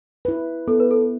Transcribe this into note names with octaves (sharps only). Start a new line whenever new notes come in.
E4 B4
B3 A4
B4
A4